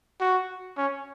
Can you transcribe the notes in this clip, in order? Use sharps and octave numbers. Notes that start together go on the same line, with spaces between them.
F#4
C#4